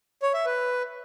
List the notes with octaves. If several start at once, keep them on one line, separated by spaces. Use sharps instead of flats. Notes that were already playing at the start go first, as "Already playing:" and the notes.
C#5
E5
B4